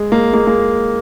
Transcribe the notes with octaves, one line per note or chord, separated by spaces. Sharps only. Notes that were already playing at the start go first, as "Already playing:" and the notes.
Already playing: G#3
G#3 A#3
G#3 A#3
G#3 A#3